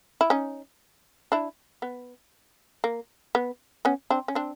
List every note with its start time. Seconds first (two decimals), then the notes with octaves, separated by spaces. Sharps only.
0.21 E4
0.30 C#4 D#4
1.32 D4 E4
1.82 B3
2.84 A#3
3.35 B3
3.85 B3 C#4
4.10 C4 D4
4.28 C#4
4.35 C4 D4